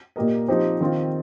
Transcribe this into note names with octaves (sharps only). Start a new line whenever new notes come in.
A#2 A#3 G4 A#4 D#5
F3 C4 D#4 G4 C5
D#3 C4 F4